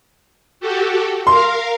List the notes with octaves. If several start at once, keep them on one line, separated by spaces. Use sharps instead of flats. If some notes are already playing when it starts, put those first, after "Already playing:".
F#4 G4 A4
A#4 F5 C6